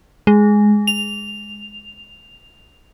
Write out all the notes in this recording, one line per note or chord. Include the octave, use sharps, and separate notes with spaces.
G#3
F7